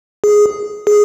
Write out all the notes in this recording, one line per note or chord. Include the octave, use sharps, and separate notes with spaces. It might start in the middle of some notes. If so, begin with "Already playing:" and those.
G#4
G#4